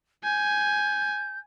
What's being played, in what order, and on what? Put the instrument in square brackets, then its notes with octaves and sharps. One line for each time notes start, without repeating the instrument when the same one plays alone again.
[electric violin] G#5 [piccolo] G6